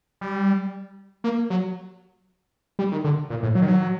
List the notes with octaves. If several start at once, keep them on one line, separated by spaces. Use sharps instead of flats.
G3
A#3
F#3
G3
D#3
D3
A#2
A2
F#3
D#3
F#3